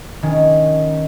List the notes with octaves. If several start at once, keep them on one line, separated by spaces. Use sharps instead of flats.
D#3 C#4